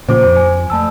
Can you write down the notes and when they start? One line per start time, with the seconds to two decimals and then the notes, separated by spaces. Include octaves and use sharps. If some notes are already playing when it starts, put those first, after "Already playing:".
0.09 A#2 C#3 F3 C5 D6
0.24 F2
0.37 G#5
0.70 A3 A5 E6